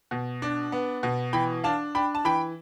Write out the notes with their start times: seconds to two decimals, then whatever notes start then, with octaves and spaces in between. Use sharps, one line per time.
0.11 B2
0.42 D4
0.72 B3
1.03 B2
1.33 E3 G5 B5
1.64 D4 F5 A5
1.95 D4 G5 B5
2.15 A5
2.25 E3 G5 B5